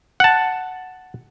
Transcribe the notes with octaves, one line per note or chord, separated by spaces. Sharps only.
F#5 A5